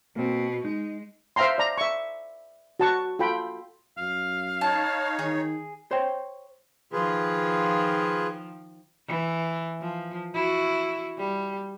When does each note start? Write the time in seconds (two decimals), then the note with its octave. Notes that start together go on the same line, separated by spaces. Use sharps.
0.16 B2 A#3 C4
0.65 G#3 D#4
1.36 C5 E5 F5 G5 A#5 C6
1.58 D5 A#5
1.78 E5 C#6
2.80 F#4 A5 C#6
3.19 F4 A4 G5 B5
3.97 F#2 F5
4.61 D#4 C#5 A5
5.19 D#3 G#4
5.91 C5 C#5 G5
6.92 D#3 F3 F4 G#4 B4
9.08 E3
9.81 F3
10.34 E4 F#4
11.18 G3